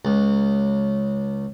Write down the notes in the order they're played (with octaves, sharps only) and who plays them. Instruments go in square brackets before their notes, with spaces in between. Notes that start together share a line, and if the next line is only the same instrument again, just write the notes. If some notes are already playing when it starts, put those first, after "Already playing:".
[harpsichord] C#2